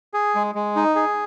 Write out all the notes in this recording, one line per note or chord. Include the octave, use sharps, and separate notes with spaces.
G#4
G#3
G#3
D#4
G#4